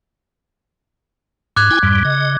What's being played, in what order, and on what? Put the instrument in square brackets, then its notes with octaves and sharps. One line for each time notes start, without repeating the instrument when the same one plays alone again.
[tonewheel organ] G#2 [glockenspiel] D6 F#6 G#6
[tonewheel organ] E4 G5 G#5
F2 G#2 G3
C#3 D#5